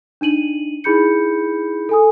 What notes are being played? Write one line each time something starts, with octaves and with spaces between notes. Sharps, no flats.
D4 D#4 D#7 F#7
D#4 E4 G#4 B5 G6 C#7
A4 G#5 D#6